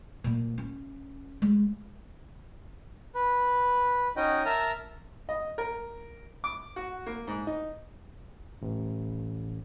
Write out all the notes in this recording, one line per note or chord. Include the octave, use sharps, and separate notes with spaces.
A#2 A#3
C#4
G#3
B4
C#4 D#4 F#4 D#5 G5
A#4 E5 A5 A#5 E6 F6
D#5
A#4
D6
F#4
A#3
G#2
D#4
A1